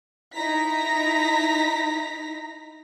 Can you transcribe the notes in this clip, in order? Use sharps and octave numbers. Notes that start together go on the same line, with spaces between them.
D#4 E4 A#5 A#6 B6